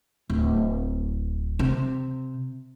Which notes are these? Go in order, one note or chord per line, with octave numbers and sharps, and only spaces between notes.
D1
C3